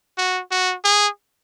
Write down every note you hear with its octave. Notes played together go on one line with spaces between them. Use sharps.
F#4
F#4
G#4